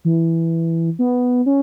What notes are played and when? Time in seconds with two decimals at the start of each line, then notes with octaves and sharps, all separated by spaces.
0.05 E3
0.99 B3
1.46 C#4